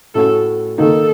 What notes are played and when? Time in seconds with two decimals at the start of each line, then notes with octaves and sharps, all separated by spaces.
0.15 A2 A3 C#4 F#4 A4
0.78 D#3 A#3 D#4 A4